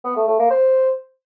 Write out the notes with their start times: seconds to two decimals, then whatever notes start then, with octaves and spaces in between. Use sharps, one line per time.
0.05 B3
0.16 A3
0.28 A3
0.39 A#3
0.51 C5